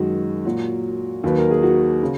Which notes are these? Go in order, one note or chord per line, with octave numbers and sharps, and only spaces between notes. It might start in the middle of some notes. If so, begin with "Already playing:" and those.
Already playing: F#2 D#3 G#3 F#4
A#2 F#3 F#4
D#2 D#3 F#3 B4
A#4
G#4
F#4
C#3